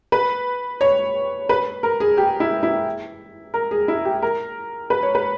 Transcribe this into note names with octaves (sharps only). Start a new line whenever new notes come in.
B4
C#5
B4
A#4
G#4
G4
E4
E4
A#4
G#4
E4
G4
A#4
B4
C#5
B4